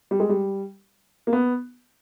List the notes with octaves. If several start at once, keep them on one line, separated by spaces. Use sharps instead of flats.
G3
G#3
G3
A#3
B3